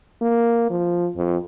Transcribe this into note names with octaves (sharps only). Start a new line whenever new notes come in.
A#3
F3
F2